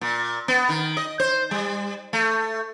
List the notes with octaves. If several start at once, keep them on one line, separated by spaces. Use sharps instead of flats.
A#2
B3
D#3
D#5
C5
G3
A3